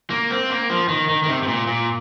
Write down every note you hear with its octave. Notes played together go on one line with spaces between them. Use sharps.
A#3
C4
A#3
F3
D#3
D#3
D#3
C3
C3
A#2
A#2